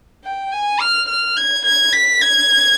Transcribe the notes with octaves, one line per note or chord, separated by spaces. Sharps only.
G5
G#5
F6
F6
G#6
G#6
B6
G#6